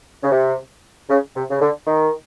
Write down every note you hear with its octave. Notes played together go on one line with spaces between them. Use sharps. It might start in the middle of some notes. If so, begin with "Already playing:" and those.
C#3
C3
C#3
C3
C#3
D3
D#3